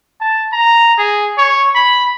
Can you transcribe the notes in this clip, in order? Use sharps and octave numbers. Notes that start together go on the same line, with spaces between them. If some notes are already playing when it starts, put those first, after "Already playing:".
A5
A#5
G#4
C#5
B5